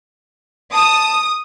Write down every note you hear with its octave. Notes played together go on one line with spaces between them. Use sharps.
A5 D#6